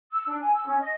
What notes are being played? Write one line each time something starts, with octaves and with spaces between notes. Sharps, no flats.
E6
D4
G#5
E6
C#4
D#5